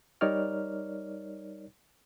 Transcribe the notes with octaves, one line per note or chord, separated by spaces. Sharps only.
G3 D#4 A#4 C#5 D5 F6